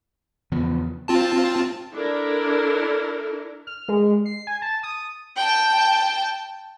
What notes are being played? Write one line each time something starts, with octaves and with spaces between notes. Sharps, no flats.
E2 C#3 F3 B3
C4 F4 A5
D4 E4 A4 A#4
F6
G#3
C7
G#5
A5
D#6
G5 A5